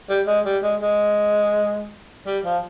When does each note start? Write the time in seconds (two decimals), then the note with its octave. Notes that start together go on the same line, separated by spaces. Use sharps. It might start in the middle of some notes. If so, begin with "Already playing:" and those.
0.09 G3
0.27 G#3
0.45 G3
0.63 G#3
0.81 G#3
2.26 G3
2.45 F3